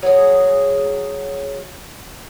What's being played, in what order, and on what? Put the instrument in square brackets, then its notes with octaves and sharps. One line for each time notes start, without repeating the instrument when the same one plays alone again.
[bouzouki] F#3 G#4